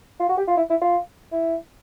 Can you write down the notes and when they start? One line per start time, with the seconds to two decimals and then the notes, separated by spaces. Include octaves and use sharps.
0.20 F4
0.29 F#4
0.37 G4
0.47 F4
0.57 E4
0.70 E4
0.82 F4
1.32 E4